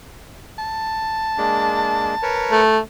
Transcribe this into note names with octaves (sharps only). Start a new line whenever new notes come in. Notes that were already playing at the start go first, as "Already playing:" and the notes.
A5
G#3 A#3 D4
A#4 B4 C#5
A3